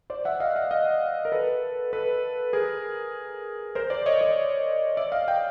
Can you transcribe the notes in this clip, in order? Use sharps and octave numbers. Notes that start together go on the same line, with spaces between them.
C5 D5
E5 F#5
D#5 F5
E5 F#5
D#5 F5
A#4
A4 B4
A4 B4
G#4 A#4
A#4 C5
C5 D5
C#5 D#5
C#5 D#5
D5 E5
D#5 F5
F5 G5